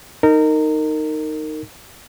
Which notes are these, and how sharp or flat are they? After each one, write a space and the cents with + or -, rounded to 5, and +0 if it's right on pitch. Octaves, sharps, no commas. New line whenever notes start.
D#4 +0 A#4 -25